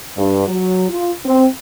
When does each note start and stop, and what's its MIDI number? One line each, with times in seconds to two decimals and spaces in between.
0.17 0.47 43
0.47 0.85 54
0.90 1.12 65
1.25 1.46 60